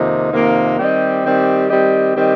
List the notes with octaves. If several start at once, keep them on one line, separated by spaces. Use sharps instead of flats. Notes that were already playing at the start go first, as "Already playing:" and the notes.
Already playing: F2 C3 D#3 A#3 D#4
F2 C3 D#3 A#3 D#4
D#3 G3 C4 G4 D#5
D#3 G3 C4 G4 D#5
D#3 G3 C4 G4 D#5
D#3 G3 C4 G4 D#5